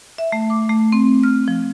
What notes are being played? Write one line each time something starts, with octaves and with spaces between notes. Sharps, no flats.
E5
A3
D6
A3
C4
F6
F3